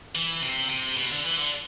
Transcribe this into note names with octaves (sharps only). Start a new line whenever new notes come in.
E3
C3
C3
B2
D3
E3
D3